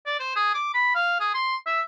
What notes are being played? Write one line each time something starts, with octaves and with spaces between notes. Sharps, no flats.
D5
C5
G#4
D6
B5
F5
G#4
C6
E5